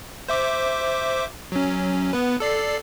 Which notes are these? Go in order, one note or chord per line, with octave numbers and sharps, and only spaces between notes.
C5 E5 D6
F#3 C#4
B3 B4
A4 D5 C7